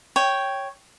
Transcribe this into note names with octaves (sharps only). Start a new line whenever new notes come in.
C#5 G5